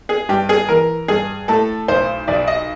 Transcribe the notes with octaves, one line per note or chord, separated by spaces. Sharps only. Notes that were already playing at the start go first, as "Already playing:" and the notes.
G#4
G2 G4
G#4
E3 A#4
G2 G#4
A2 A4
B1 C5
B1 D5
D#5